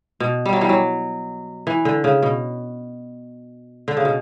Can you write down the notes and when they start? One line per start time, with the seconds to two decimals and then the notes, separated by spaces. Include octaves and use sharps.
0.20 B2
0.46 G3
0.53 F#3
0.61 E3 G3
0.69 F#3
1.67 E3
1.85 D3
2.04 C#3
2.23 B2
3.88 D3
3.97 C#3
4.05 B2